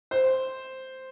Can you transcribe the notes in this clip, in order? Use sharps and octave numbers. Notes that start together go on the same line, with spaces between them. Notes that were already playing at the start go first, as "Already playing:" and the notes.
C5